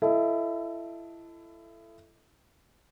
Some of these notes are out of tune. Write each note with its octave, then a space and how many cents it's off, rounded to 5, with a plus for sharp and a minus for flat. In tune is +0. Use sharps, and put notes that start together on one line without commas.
E4 +30 A4 +0 D#5 +25